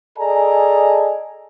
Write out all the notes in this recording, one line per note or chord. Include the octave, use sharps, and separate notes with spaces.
G#4 A4 D5 D#5 G#5 A#5